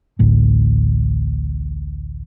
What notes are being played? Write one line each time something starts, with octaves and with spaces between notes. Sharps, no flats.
A1 D2 A2